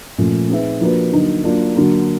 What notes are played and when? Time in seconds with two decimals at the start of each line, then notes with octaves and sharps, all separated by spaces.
0.18 A#2 F3 A3 C#4
0.49 C4 D#4 G#4 B4 E5
0.81 F3 A#3 D4 F#4 B4
1.12 D3 F#3 A#3 D#4
1.44 F#3 A#3 D4 F4
1.75 D3 F#3 A#3